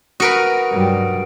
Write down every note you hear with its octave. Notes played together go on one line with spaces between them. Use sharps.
F#4 A#4 B4 D#6 C#7 D7
G2 F#3 G3